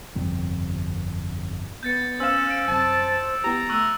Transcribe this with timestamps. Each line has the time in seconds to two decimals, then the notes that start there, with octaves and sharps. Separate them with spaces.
0.15 G1 F2 C3 G3
1.83 B3 G6 A6 C#7
2.20 C#4 C5 F5 E6 E7
2.50 D7
2.68 F#2 C3 C5 A5
3.44 B3 E4 G4 A#5
3.69 A3 C#6 E6 F#6